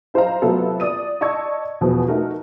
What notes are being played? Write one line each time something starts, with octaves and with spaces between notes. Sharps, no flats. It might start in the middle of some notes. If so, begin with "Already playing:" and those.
E4 C5 D#5 F5 A#5
C3 F#3 A3 B3 F4 A4
D5 D#6 D#7
D5 D#5 A5 C#6 E6 G#6
E2 B2 F3 B3
A3 D#4 F#4 A#4